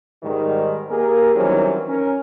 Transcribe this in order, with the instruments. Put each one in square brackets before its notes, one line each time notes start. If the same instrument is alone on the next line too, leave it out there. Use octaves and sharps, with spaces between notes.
[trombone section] G#2 D#3 G3
A#3 G4 G#4 A#4
D#3 E3 F#3 G3 C4 C#4
C#4 A#4